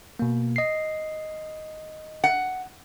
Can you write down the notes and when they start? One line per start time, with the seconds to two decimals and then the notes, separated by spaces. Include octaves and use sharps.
0.19 B2 A#3
0.56 D#5 C7
2.24 F#5